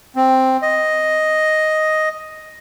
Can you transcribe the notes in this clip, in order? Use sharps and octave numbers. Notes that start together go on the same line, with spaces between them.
C4
D#5